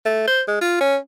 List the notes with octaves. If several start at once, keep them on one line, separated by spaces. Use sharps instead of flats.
A3
C5
G#3
F4
C#4